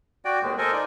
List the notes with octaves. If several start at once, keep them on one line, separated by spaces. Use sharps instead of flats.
F#4 D5 G5
D#2 B2 D#3 G#3
A4 A#4 C5 D#5 G#5
D#4 F4 D5